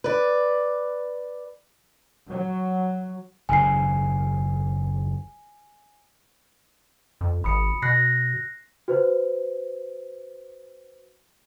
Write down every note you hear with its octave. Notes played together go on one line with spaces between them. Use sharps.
B4 D5
F#3
F#1 D#2 G#2 G#5 C7
F2
G#1 B5 D#6 C#7
B2 F#6 A#6 C7
F#4 B4 C5